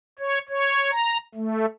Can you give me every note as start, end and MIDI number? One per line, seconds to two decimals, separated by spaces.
0.19 0.38 73
0.49 0.90 73
0.91 1.17 82
1.35 1.66 57